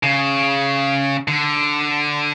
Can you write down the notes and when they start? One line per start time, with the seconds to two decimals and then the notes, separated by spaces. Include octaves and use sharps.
0.03 C#3
1.28 D3